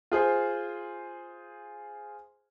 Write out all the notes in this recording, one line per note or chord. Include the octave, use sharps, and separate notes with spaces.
F4 G#4 C5